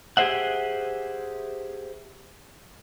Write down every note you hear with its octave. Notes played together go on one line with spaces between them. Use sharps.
G4 G#4 B4 C5 E5 F#5